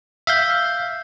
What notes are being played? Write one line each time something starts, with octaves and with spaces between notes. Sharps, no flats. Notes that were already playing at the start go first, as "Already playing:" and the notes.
E5 F5 G6